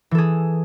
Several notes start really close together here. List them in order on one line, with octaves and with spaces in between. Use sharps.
E3 A4 G#4